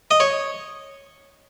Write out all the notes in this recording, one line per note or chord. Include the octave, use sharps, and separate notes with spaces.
D#5
C#5